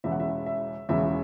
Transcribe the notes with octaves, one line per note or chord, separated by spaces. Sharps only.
E1 E2 C#3 E5
F#5
E5
E5
E1 E2 C#3 E5